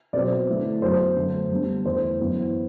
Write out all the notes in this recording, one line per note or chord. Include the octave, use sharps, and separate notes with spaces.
B2 F#3 C4 D5
D3 A3 E4
F#2 F#3 B3 C5
F#2 D3 A3 D4
D3 G3 B3 D4
E2 D3 A3 C5
F#2 E3 B3 E4